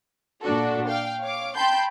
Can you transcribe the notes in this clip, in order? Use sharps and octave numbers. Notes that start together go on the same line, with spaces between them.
A#2 D4 F#4 A4
F5 G5
C#5 F5 D6
G5 A5 B5 C6 G6